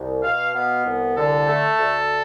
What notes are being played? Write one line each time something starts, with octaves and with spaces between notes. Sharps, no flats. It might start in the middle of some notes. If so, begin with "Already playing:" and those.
Already playing: C2
B2 F5
B3 F5
C2
D3 A4
A3
D2